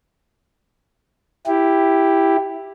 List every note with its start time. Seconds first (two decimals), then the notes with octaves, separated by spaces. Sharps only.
1.47 E4 G4